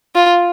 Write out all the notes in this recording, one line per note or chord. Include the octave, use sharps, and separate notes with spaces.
F4